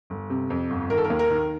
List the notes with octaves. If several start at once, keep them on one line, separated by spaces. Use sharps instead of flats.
G1
C3
F2
G1
D#3 A#4
A4
A#4
D#2
A#4
D#3